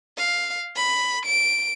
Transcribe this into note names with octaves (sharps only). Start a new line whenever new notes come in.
F5
B5
D7